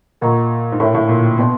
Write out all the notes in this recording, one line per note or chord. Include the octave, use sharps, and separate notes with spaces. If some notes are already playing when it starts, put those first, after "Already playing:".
A#2 A#4 D#5 F#5 A#5 C#6
G#2
A2 A#4 C#5 E5 G5
A2
A#2
B2 B4 D5 G5 C6